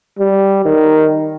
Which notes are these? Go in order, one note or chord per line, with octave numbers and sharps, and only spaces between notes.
G3
D#3